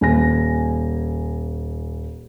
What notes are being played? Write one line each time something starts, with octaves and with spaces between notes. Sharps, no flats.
D#1 G#5 A#6